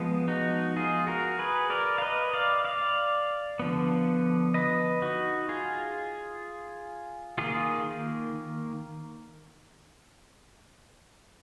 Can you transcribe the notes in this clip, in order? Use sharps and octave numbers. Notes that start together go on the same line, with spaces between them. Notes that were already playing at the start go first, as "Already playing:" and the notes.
Already playing: F3 G#3 B3
D#4 F#4
F4 G#4
F#4 A#4
G#4 B4
A#4 D5
F5
B4 D#5
D5 F5
D5 F5
D3 F3 B3
B4 D#5
D#4 F#4
F4 G#4
D#3 A#3 F4 G#4